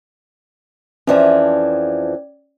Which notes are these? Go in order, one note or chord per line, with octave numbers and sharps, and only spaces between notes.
F2 E3 F3 C#4 D5